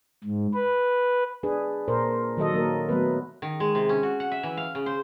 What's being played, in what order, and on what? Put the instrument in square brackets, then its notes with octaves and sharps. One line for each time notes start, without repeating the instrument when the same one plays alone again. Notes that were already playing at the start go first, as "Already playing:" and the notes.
[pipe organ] G#2
B4
[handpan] D4 G#4 B4
A#2 A#4 C5
D#3 F#3 A4 D#5
F#3 A#3 A#4
F#3 A3 B3 B4
[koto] D#3
G#3
C3
C#4
F#4
F#5
E5
E3
F5
C#3
C5